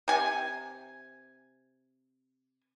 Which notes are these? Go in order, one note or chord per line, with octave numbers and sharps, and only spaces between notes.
C3 G#5